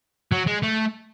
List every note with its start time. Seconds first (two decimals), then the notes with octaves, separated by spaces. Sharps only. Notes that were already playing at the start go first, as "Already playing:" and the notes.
0.32 F#3
0.47 G#3
0.63 A3